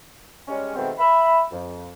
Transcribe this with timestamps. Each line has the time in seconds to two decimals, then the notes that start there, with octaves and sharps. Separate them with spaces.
0.48 G3 G#3 C#4
0.76 B2 D#3 G#3 A3 B3 C4
0.98 E5 B5
1.51 F2